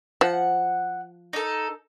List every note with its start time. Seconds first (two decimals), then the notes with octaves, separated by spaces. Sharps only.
0.21 F3 F#5
1.33 D#4 A4